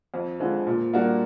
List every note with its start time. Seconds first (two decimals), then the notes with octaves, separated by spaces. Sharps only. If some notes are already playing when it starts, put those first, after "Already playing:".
0.14 F2
0.40 D3 F3 G#3
0.67 A#2
0.94 G3 A#3 D4 F#4